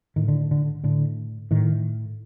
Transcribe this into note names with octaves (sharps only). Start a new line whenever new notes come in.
A2 D#3
D3
D3
A2 D3
A2 D#3